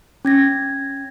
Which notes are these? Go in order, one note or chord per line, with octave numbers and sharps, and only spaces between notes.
C#4 G#6 A#6